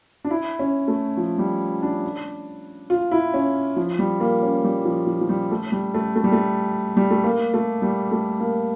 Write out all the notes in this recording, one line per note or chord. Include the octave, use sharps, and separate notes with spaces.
D4
E4
C#4
A3
F3
G3
D4
F4
E4
C#4
F3
G3
A#3
C#4
G3
F3
F3
F3
G3
A3
G3
A3
A3
G3
A3
G3
A3
A#3
A3
G3
A3
A#3